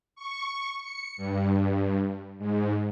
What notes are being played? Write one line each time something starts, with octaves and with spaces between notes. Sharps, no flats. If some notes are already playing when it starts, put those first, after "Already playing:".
C#6
C#7
G2
G#2